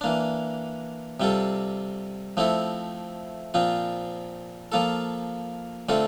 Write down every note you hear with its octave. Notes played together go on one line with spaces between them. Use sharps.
E3 A#3 D4
C3 G3 C4 F4 A4
F3 A3 C4 E4 A4
A#2 F3 C4 F4
F3 A#3 F4 A4
D3 A3 C4 F4 A4